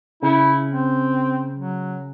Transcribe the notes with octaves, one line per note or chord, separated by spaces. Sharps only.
C#3 E4
C4
F#3